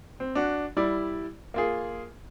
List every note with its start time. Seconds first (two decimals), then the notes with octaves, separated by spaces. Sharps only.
0.20 C4
0.35 D4 F#4
0.77 G3 E4 D5
1.54 A#3 F4 G#4